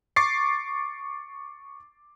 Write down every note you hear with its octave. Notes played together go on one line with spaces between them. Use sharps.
C#6 D6 A6 C7